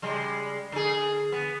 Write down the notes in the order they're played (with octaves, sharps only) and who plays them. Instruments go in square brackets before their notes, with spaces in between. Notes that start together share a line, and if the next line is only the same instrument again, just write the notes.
[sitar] C#3 G3 G#3
D3 G#4
B3